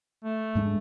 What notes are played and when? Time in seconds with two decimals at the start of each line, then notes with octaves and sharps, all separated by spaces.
0.25 A3
0.55 G#2 G#3 D4